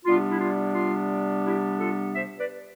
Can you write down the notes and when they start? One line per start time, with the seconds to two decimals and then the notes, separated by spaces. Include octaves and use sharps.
0.05 C3 G3 B3 D4 F4
0.30 E4
0.41 F4
0.74 F4
1.45 E4 G4
1.79 F4 A4
2.14 C5 E5
2.38 B4 D5